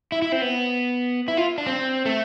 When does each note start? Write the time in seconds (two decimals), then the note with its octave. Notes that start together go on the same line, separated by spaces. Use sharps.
0.12 E4
0.22 E4
0.32 C4
0.42 B3
1.28 E4
1.37 F4
1.58 D4
1.67 C4
2.06 A3